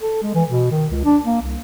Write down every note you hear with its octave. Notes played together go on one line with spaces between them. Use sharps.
A4
G#3
E3
B2
D#3
C#2
D4
A#3
C2